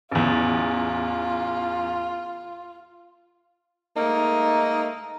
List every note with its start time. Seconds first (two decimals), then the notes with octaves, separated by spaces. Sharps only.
0.11 A1 E2 F4
3.97 G#2 A3 A#3 D#4